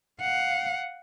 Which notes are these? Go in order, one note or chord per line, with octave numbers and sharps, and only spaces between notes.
F5 F#5